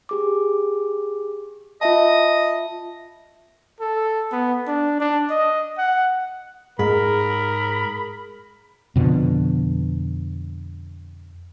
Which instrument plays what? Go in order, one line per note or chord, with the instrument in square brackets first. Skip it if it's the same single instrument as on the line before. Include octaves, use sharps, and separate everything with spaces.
[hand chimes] G4 G#4 D6
[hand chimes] F4 E5 A5 [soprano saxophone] D#5
[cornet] A4
B3
D4
D4
D#5
F#5
[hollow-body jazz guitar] G#2 [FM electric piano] G#4 [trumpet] A#4 [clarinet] B5
[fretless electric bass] F2 B2 D3